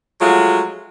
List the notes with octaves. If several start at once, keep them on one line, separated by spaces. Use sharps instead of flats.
F3 F#3 G#3 A3 F4 F#4